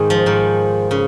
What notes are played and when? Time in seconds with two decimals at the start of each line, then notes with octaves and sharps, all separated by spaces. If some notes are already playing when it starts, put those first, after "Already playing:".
Already playing: G#2 D#3
0.10 F3
0.26 G#2 D#3
0.91 C#3